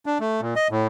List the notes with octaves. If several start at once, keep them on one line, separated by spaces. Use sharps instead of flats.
D4
A3
A#2
D#5
A2